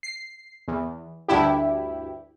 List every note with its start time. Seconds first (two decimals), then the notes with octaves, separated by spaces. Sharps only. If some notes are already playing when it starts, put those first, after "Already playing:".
0.03 C7
0.68 E2
1.28 D2 G2 E4 G4